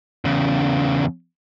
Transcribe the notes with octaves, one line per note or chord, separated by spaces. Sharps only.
E2 C#3